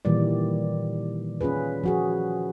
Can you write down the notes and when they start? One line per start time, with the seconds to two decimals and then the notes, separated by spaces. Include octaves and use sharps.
0.05 A#2 D#3 E3 G3 D5
1.41 C#4 F4 G#4 B4
1.84 F3 F#4 G#4